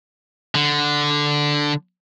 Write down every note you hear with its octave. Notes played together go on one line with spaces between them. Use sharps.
D3